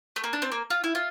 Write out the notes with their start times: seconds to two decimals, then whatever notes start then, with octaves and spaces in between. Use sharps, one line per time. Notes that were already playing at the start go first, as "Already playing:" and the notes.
0.16 A3
0.24 A#3
0.33 D4
0.42 C4
0.52 A#3
0.70 F4
0.84 E4
0.95 F4